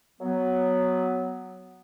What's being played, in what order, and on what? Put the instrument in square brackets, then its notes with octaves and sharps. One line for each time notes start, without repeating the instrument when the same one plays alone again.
[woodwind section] F#3 B3